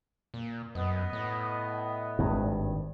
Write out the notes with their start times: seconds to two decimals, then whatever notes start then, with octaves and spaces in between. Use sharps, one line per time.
0.34 A#2
0.75 F#2 B3 D#5
1.13 A2
2.19 G#1 G2